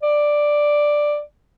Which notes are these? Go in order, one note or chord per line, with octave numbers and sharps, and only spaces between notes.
D5